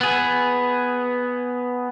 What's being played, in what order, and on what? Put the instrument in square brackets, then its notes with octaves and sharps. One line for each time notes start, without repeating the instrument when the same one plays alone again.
[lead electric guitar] B3 G#4